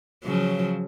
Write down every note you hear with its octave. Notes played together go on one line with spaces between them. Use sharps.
C#3 F3 F#3